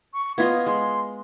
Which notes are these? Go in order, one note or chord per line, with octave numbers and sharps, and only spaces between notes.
C#6
B3 F4 D#5 G#6
G#3 C6